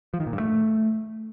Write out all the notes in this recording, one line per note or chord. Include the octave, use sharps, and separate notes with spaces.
F3
D#3
A#2
G2
A3